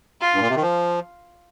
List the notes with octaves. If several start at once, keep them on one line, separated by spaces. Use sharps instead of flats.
F4
G2
A#2
C3
D#3
F3